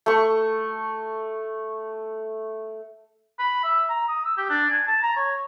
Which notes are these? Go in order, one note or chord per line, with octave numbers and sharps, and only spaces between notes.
A3 C#6
B5
E5
A#5
D#6
E6
G4
D4
G#5
A5
A#5
C#5